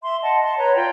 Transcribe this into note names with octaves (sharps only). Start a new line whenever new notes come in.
E5 C6
D#5 F#5 A5
A5 C6
B4 C#5 A#5
F4 D5 G5 C6